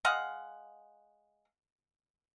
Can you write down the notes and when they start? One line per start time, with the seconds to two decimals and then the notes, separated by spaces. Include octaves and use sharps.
0.05 G#3 D#5 F5 F#5